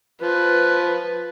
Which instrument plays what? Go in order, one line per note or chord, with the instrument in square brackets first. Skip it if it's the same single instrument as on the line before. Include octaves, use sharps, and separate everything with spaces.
[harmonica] F3 [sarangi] B4